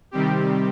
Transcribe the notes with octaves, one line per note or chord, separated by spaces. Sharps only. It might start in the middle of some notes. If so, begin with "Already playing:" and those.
C3 D#3 G3 C4 G4